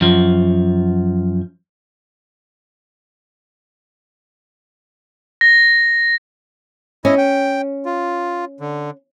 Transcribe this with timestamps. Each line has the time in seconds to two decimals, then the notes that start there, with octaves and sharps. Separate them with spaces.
0.01 F#2 F3
5.41 A#6
7.05 C#4 E4 D#5
7.18 G5
7.85 F4
8.60 D3